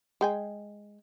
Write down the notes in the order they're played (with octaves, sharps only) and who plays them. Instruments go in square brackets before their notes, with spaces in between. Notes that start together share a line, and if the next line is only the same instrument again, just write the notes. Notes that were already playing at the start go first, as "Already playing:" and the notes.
[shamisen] G#3 G5 G#5